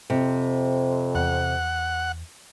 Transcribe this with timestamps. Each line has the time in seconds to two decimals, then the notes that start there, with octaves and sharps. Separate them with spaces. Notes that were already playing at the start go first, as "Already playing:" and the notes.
0.10 F2 C3
1.15 E2 F#5